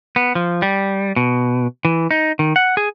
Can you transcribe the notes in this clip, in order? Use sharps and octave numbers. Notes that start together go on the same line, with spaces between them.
B3
F3
G3
B2
E3
D#4
D#3
F#5
G#4